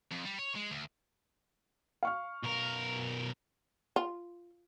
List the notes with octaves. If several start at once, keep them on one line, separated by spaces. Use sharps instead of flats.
F2
G3
C#5
G#3
D2
F5 C#6 F6
B1 A#4
F4